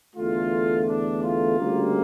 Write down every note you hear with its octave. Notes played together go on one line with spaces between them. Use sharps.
E2 D3 A3 F4
D4
F4
D2 C#3 G3 A#3